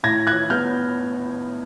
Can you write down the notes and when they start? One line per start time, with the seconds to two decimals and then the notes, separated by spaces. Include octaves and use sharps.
0.03 A2 G#6 A#6
0.27 F#6 G#6
0.50 B3 F6 G6